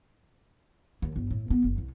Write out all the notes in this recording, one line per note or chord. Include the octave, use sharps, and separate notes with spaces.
D#2
G1
A2
B3
F#1
C2